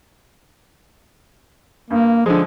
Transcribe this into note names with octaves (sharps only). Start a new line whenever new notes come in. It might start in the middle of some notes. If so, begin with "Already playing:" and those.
G2 A#3
D3 F3 G#3